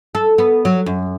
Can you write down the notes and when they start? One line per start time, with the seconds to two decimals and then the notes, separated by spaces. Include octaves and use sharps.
0.15 A4
0.38 B3
0.65 F#3
0.86 F#2